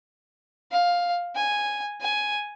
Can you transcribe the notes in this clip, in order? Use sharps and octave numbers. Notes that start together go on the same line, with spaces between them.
F5
G#5
G#5